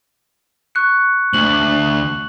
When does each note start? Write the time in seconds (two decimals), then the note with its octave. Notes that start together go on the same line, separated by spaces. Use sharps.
0.75 C#6 F#6 C#7
1.33 D2 F#7